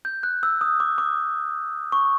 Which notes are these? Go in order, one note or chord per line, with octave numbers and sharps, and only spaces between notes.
G6
F#6
E6
D#6
D6
D6
C#6